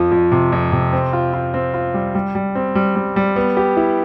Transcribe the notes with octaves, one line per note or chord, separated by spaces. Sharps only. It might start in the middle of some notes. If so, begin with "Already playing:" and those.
Already playing: F2 F3
F2
C3
F2
C3
C4
F4
F4
C4
F4
G3
G3
G3
C4
G3
G3
G3
B3
G4
E4